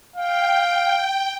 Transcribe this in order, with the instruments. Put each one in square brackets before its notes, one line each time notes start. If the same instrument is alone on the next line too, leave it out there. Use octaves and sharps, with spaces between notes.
[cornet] F5 [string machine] G5